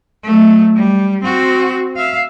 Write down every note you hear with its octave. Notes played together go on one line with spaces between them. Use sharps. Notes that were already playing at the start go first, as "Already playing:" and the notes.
F#3 A3
G3
C4 F#4
E5 F5